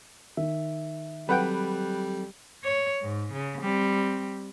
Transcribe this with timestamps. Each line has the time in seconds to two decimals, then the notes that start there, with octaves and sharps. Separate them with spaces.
0.37 D#3 E5
1.29 F#3 G3 C4 A4 B4 F#5 G5
2.64 C#5
3.02 G#2
3.33 C#3
3.61 G3 C4